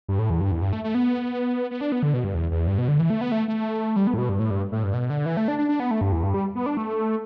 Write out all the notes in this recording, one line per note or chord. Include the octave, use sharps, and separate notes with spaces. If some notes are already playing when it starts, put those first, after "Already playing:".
G2
A2
E2
G2
E2
G2
A3
A3
B3
B3
D4
B3
D3
B2
G2
E2
E2
G2
B2
D3
E3
A3
B3
A3
A3
G3
B3
A2
B2
G2
A2
G2
A2
G2
B2
D3
E3
A3
D4
D4
D4
B3
A3
G2
E2
G2
G3
B3
D4
A3